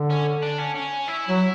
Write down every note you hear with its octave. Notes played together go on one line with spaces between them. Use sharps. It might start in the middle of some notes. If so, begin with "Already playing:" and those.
Already playing: D3
C#4
D4
C#4
C#4
E4
F#3